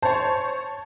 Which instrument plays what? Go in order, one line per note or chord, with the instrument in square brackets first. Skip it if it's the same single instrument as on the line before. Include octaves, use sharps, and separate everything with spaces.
[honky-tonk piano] C5 C#5 [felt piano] A5